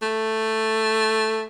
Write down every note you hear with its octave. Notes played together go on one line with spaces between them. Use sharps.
A3